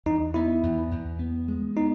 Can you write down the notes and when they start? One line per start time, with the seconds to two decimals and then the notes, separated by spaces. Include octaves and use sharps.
0.06 E2 D#4
0.34 B3 E4
0.63 E2
0.92 E2
1.19 B3
1.48 G#3
1.76 B3 D#4